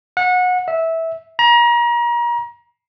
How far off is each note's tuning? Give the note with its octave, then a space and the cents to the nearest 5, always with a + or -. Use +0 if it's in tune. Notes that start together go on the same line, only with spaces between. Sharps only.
F#5 -25
E5 -15
A#5 +35